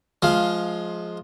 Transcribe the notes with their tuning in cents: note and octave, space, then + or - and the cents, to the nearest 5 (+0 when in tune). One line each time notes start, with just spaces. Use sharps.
F3 +10 G#3 +20 F5 +0